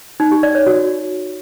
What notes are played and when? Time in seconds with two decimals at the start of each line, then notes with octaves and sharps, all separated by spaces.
0.20 D#4
0.31 G4
0.43 D5
0.55 C#5
0.67 F#4